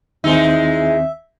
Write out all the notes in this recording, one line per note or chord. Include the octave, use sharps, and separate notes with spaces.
D#2 D#3 E3 G#3 C4 D#4 E5